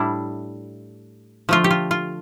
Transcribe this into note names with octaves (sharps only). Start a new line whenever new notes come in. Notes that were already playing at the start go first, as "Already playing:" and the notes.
Already playing: A2 G3 D4 E4
D3 F3 A3 F4
G4
F4
F4